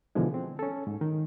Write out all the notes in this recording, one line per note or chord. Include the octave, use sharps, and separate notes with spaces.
B2 D3 E3 F3 G#3
C4
C#4 A4
G#2
D#3